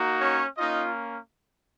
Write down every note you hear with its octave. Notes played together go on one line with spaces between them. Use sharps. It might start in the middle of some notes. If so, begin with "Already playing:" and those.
Already playing: A#3 D#4 F#4
C#4 C#5
A#3 C#4 D#4 F4 D#5